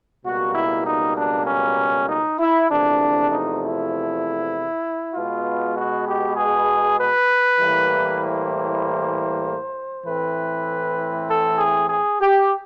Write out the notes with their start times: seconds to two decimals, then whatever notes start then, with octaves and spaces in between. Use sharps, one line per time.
0.25 C#2 B2 G3 A#3 F#4
0.55 E4
0.86 D#4
1.17 D4
1.47 C#4
2.08 D#4
2.39 E4
2.69 E2 C3 F3 A3 D4
3.31 D#4
3.62 E4
5.14 B2 G#3 B3 F4
5.77 F#4
6.07 G4
6.37 G#4
6.99 B4
7.60 A2 E3 G3 A#3
8.21 C5
10.05 A2 E3 A3 C4 B4
11.28 A4
11.58 G#4
11.89 G#4
12.20 G4